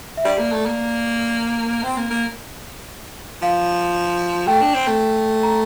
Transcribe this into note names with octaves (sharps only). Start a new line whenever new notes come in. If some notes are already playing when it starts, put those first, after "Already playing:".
E5
G3 D5
A#3
A3
A#3
C4
A#3
A#3
F3 F5
A3 G5
D4
C4
A3
A#5